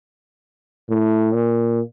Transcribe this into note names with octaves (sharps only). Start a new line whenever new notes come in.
A2
A#2